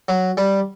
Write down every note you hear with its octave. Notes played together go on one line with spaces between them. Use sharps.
F#3
G3